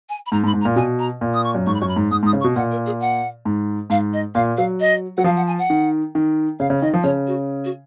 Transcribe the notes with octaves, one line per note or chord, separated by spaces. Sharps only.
G#5
B5
G#2 A#5
G#2
B5
G#2
A#5
A#2
B2 G#5
A#5
A#2
D#6
C#6
F#2
G#2 C#6
B5
F#2 C#6
B5
G#2
G#2 D#6
G#2
D#6
C#3
C#6
B2
A#2 F#5
A#4
G#4
F#5
G#2
G#2 F5
D#5
A#2 F5
F#3 F5
D#5
F#3 F#5
F3 F5
F#5
G#5
F#5
D#3
D#3
C#3 F5
C#3
D#3 D#5
F3
C#3 C#5
F#4
F#4